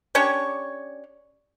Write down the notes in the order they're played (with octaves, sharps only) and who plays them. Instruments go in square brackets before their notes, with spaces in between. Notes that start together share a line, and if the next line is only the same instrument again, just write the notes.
[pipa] C#4 D4 G4 C#5